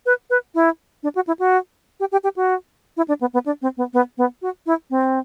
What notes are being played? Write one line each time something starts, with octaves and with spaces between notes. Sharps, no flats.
B4
B4
E4
D4
F#4
E4
F#4
G4
G4
G4
F#4
E4
D4
B3
B3
D4
C4
B3
B3
B3
F#4
E4
C4